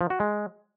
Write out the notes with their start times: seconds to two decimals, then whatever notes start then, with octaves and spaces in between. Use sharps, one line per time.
0.01 F3
0.10 F#4
0.20 G#3